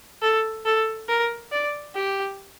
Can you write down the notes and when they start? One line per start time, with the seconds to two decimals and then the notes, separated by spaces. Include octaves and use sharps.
0.22 A4
0.65 A4
1.08 A#4
1.52 D5
1.95 G4